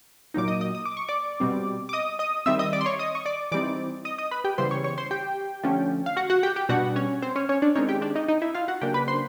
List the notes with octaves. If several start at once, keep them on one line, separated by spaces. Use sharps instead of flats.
A#2 F#3 A#3 D#4 D6
D#5 D#6
D#5 D#6
D#6
D6
C#6
D5 D6
B2 G3 C4
D6
D#5 D#6
D#5 D#6
D#3 G3 C4 E5 E6
D#5 D#6
D5 D6
C6
C#5 C#6
D#5 D#6
C#6
D5 D6
E3 G3 C4 D#4 D5 D6
D#5 D#6
D#5 D#6
B4 B5
G4 G5
C#3 E3 G3 B3 C5 C6
C#5 C#6
C#5 C#6
C5 C6
G4 G5
D3 F3 A3 C#4
F5
F#4 F#5
F#4 F#5
G4 G5
G4 G5
B2 G3 B3 D4 F#4 F#5
C#4 C#5
C4 C5
C#4 C#5
C#4 C#5
D4 D5
D#3 G#3 C4 C#4 D#4 C#5
G4 G5
D4 D5
D#4 D#5
D#4 D#5
E4 E5
F4 F5
F#4 F#5
C#3 F#3 A#3 D4 G4 G5
B4 B5
C5 C6